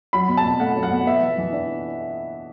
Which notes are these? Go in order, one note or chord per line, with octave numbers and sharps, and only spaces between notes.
F#3 B5
B2
A5
B2
A3 F#5
F#3
F#5
B2
B3 E5
E3
E3
D4